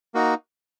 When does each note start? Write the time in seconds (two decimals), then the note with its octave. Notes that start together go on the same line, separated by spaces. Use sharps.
0.14 A#3 D#4 F#4